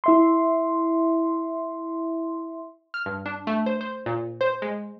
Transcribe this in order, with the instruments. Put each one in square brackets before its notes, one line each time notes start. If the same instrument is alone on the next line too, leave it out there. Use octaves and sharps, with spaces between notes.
[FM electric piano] E4 E5 C6
[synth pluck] F6
G2
D4
A3
C5
C5
A#2
C5
G#3